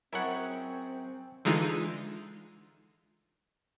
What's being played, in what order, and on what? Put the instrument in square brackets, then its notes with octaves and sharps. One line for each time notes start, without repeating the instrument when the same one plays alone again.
[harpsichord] F#2 G#4 D5 [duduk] C4 [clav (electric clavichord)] E4 F#5 [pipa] A#4 C#5
[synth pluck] D3 E3 G#3 D#4 F4